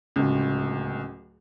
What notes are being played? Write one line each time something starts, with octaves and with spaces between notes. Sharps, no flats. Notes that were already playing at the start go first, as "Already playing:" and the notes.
D1 C#2